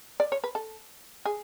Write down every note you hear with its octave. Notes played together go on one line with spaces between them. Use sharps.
D5
C#5
B4
A4
G#4